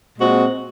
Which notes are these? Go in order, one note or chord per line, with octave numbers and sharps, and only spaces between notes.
A#2 G#3 C4 F#4